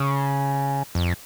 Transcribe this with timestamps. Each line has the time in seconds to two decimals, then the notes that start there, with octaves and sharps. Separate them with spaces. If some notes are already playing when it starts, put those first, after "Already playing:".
Already playing: C#3
0.95 F2